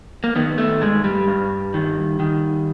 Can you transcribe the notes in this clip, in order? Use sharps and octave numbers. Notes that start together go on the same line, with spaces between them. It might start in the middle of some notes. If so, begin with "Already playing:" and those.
A#3
D#3 B3
A3
G2 G#3
G3
G2
D#3
D#3